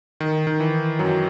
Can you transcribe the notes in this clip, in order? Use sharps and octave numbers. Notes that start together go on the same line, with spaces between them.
D#3
D#3
E3
F#2 F#3